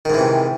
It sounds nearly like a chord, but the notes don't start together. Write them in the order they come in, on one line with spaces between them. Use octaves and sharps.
D#3 G#2 E3 C3